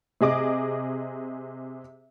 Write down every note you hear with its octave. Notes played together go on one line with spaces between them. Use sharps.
C3 G#4 D#5 D6